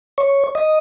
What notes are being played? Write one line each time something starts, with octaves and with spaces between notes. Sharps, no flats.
C#5
D#5